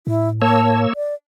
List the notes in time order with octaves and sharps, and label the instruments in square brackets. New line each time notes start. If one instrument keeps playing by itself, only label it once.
[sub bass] A2 [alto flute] E4
[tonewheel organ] A#3 C#5 E6 [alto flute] A5
[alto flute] D5